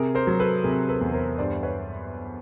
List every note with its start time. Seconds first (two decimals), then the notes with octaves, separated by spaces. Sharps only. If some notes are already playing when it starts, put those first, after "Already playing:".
Already playing: C3 G#4 A#4
0.15 A#4 C5
0.27 F#3
0.39 A4 B4
0.64 C3 G#4 A#4
0.89 A4 B4
1.01 E2
1.14 A#4 C5
1.38 G2 C5 D5
1.63 B4 C#5